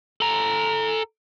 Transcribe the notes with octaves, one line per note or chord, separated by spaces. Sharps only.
A4 A#5